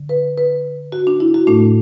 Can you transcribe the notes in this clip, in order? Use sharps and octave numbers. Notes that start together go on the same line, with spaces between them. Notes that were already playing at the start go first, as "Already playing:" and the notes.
Already playing: D3
B4
B4
F#4
D4
E4
F#4
A2 A3 D4